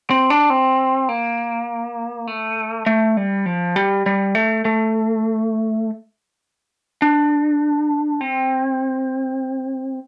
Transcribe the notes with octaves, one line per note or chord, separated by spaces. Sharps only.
C4
D4
C4
A#3
A3
A3
G3
F3
G3
G3
A3
A3
D4
C4